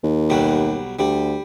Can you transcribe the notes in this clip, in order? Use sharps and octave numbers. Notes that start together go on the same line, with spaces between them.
D#2
B1 F#3 G3
D2 G3